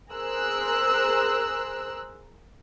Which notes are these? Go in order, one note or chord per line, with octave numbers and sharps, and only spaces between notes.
G#4 A#4 C5 E6 F#6